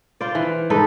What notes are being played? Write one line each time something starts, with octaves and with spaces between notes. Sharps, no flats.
F4 C5 D5
E3
G#2 D#4 A4 B4